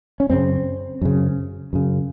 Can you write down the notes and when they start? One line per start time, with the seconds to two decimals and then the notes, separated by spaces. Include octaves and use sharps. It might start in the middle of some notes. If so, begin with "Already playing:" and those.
0.20 C#4
0.30 F#2 C#3 C4
1.02 F#2 C#3
1.73 F#2 C#3